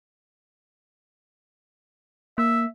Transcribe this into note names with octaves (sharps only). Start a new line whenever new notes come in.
A#3 E5